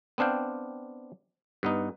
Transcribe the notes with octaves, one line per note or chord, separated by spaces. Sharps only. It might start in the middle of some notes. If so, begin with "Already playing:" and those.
B3 C4 D4 F5 G5
G2 B3 D#4